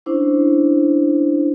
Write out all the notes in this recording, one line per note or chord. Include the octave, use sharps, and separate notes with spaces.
C#4 D4 E4 C5